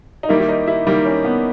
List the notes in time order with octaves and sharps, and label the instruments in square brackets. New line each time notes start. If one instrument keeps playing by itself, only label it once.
[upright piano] D#4
[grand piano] D#3 G3 A#3 [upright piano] E4
[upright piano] E4
D#4
E4
[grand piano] D#3 G3 A#3
[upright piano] C#4
B3